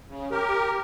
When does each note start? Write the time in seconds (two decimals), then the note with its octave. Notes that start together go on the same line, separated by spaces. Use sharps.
0.09 C#3
0.31 G4 A#4